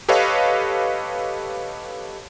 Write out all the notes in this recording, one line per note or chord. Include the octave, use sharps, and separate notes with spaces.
G4 A4 B4 C#5 D#5 F5